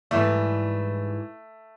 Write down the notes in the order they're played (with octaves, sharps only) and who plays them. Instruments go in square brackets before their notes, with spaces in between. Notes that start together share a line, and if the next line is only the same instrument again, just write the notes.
[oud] G#2 E3 G3 [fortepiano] A3